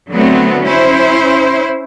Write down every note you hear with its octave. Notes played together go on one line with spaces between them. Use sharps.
D3 F#3 A3 B3 C4
C#4 E4 C5